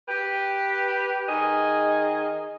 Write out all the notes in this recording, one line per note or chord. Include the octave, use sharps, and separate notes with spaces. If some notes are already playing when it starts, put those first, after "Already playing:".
G4 B4
D#3 G#4 D#5